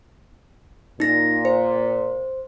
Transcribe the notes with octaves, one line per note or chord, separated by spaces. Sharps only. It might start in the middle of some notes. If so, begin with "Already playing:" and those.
A#2 D#4 A#6
C5